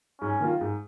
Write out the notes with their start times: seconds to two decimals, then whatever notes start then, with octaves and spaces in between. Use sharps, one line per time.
0.21 G#2 C#4
0.40 D#3 A#3 F4
0.61 G#2